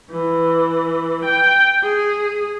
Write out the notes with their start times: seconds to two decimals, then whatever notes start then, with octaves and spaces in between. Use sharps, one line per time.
0.11 E3
1.25 G5
1.83 G#4